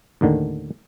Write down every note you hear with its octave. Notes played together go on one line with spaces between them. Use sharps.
D#2 A2 D3 D#3